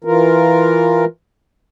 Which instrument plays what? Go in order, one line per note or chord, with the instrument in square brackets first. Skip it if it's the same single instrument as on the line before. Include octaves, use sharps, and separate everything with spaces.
[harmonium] E3 F4 A#4